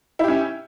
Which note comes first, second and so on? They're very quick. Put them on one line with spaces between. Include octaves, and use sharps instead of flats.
E4 G4 C#4